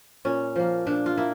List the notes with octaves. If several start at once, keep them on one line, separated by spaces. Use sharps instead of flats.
A#2 C#4
F3 A#3
A#2 D4
F4
A#3 E4